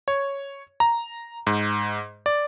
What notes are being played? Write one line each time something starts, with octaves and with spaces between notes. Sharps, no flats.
C#5
A#5
G#2
D5